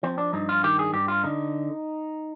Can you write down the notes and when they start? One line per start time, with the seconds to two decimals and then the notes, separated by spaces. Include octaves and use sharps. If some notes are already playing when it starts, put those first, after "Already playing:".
0.03 F3 C4
0.18 D4
0.33 G2 D#4
0.49 F4
0.63 D#3 G4
0.79 G#4
0.93 G2 G4
1.08 F4
1.24 D3 D#4